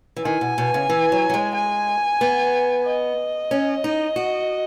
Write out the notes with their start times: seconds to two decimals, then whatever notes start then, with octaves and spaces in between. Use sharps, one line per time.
0.16 E3
0.24 D#3 G#5
0.41 B2
0.58 B2
0.74 C#3
0.89 E3
1.12 F#3
1.29 F#3
1.34 G#3
1.55 G#5
2.21 B3
2.85 D#5
3.51 C#4
3.84 D#4
4.16 F#4